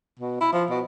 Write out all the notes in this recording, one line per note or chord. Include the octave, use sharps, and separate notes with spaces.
B2
E4
F3
B2